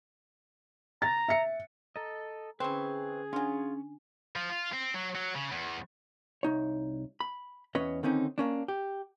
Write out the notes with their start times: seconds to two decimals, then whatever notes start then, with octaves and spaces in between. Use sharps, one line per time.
1.02 A#5 A6
1.28 E5 C#7
1.96 A4 D#5 A#5
2.60 D3 E3 C4 C#4 G#4 B4 C#6
3.33 F#3 C#4 D4 F4 G#5
4.36 F3
4.49 F4
4.73 C4
4.94 F#3
5.15 F#3
5.36 C#3
5.52 E2
6.43 C2 D#4 C#5
7.20 B5
7.75 E2 C#4 B4 C#5 D#5
8.03 D3 D#3 C4 C#4 D#4
8.38 A#3 C#4 D4
8.68 G4